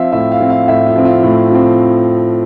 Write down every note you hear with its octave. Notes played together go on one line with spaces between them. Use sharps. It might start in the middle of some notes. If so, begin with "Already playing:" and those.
Already playing: F3 C4 E5 F5
A2 E5
F5
F3 C4
F5
A2 E5
F4
F3 C4
F4
A2
F3 C4